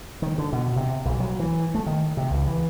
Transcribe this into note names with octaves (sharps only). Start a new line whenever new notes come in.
D#3
D3
B2
C3
B1
F#3
E3
A3
D#3
C3
C#2
E3